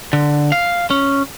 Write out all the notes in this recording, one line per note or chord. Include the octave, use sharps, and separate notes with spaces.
D3
F5
C#4